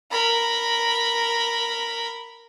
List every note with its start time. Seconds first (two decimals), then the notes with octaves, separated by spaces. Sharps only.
0.11 A#4 B5